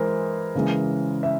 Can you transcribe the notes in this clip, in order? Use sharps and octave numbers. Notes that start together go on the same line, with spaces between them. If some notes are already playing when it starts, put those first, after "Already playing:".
Already playing: E3 G#3 A#4 C5
C#3 E3 G#3
E5